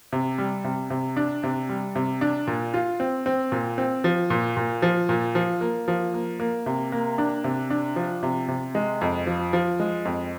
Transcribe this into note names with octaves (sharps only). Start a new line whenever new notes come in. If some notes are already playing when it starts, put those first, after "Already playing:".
C3
G3
C3
C3
D4
C3
G3
C3
D4
A#2
F4
C4
C4
A#2
C4
F3
A#2
A#2
F3
A#2
F3
A#3
F3
A#3
A#3
C3
A#3
D4
C3
D4
F3
C3
C3
G#3
F2
F3
F3
G#3
F2